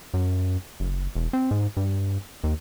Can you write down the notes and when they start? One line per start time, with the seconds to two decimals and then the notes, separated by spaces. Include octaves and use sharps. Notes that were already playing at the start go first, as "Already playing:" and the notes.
0.14 F#2
0.80 F#1
1.15 E1
1.33 C4
1.51 G#2
1.77 G2
2.44 D#2